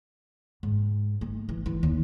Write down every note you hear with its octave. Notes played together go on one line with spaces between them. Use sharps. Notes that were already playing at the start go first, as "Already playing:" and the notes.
G#2
A3
E3
E3
D#2